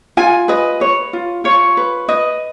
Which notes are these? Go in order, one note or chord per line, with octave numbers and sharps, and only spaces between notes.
F4 G#5
B4 D#5
B4 C#5
F4
F4 C#5
B4
B4 D#5